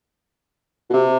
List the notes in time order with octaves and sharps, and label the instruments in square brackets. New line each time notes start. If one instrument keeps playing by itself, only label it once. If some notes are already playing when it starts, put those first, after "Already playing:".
[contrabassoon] B2
C3